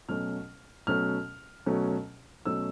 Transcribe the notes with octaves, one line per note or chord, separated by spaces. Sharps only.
B2 F#3 A3 C#4 F6
B2 F#3 A3 C#4 F6
B2 F#3 A3 C#4
B2 F#3 A3 C#4 E6